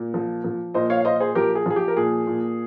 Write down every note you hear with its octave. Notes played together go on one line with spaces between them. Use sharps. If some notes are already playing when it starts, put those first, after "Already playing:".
Already playing: A#2
F3
F3
A#2 C5 D#5
C#5 F5
F5
A#2 C5 D#5
G#4 C5
F3 G4 A#4
G#4
F3 G#4
G4
A#4
A#2 G#4
A#2